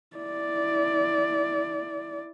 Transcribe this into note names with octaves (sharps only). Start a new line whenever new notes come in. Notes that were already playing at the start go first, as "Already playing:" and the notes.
E4 D5